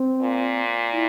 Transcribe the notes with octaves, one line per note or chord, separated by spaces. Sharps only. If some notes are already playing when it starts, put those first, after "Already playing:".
Already playing: C4
A#2
E4